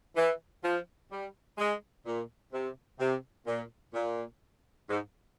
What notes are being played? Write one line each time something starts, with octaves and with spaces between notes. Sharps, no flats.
E3
F3
G3
G#3
A#2
C3
C3
A#2
A#2
G#2